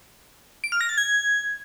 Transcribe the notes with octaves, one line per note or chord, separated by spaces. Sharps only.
D7
F6
A#6
A6
G#6